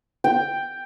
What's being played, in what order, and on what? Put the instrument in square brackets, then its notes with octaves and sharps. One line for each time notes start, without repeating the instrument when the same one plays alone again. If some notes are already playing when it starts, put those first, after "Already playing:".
[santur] G5